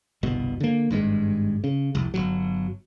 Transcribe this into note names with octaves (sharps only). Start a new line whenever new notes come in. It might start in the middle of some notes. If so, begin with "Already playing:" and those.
G1 C2 B2
D3 A#3
G#1 G2 B2 G#3
C#3
F1 C2
G1 C2 F#3